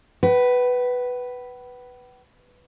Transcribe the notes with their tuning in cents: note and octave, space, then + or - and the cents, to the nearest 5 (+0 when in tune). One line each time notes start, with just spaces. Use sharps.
B4 +0 F#5 +45